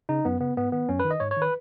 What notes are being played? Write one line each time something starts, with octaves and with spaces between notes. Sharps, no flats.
C#3 D#4
F#2 B3
C#3 B3
G#2 B3
D#3 B3
F#2 C#4
D#3 B4
D#5
G#2 C#5
C#5
D#3
B4